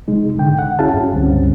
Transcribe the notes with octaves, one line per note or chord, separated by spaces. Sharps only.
C3 G#3 D#4
G#2 D3 G5
F#5
C#4 E4 F#4 G#4 F5 A5
G2 C#4
C#2 G2 D3 G3 C4 C#4